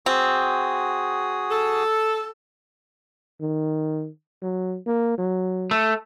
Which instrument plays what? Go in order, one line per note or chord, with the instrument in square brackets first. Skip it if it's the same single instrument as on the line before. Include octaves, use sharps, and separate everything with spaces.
[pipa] C4 [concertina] F#4 G#4 D#6
[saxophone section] A4
[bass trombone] D#3
F#3
A#3
F#3
[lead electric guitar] A3